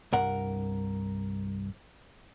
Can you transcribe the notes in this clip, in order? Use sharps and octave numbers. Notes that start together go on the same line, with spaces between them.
C2 G2 A#4 F#5